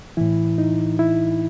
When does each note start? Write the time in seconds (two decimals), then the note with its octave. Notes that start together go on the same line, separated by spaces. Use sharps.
0.17 A2 E3 E4
0.58 D#4
0.99 E4